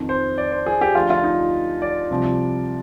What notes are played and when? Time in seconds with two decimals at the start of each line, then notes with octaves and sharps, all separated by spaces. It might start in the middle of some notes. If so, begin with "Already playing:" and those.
Already playing: F2 D#3
0.09 C5
0.38 D5
0.52 C5
0.66 G#4
0.81 G4
0.95 D2 D3 F3 F4
1.10 F4
1.24 D#4
1.82 D5
2.11 C2 C3 F3